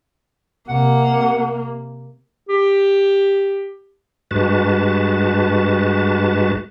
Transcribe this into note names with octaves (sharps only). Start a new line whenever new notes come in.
C3 A#3 F#5
G4
G2 G#3 F#4 B4 A5